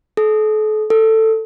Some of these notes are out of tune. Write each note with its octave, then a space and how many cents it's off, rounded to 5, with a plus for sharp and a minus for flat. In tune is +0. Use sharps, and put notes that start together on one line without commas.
A4 -40
A4 +10